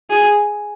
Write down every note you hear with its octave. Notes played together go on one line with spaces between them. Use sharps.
G#4